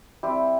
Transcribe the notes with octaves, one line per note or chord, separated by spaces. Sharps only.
G3 C4 E4 G4